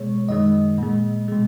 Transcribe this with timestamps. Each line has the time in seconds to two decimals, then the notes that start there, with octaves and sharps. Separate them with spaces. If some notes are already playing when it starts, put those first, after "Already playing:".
Already playing: B2 G#3 C#5
0.29 F#2 D#3 G#3 D#5
0.78 A#2 G#3
1.28 B2 G#3